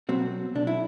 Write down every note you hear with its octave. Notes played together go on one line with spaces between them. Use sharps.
B2 F#3 C4
B1 D4
E4